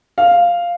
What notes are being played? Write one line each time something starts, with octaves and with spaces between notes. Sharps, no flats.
F5